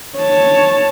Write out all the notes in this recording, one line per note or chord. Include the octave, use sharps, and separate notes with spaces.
C#5 A5